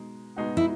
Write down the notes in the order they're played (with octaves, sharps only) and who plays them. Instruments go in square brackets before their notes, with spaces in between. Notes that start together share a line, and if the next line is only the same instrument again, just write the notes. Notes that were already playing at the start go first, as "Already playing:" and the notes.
Already playing: [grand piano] B2 G#3 D#4
B2 G#3 D#4 F#4
[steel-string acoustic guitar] E4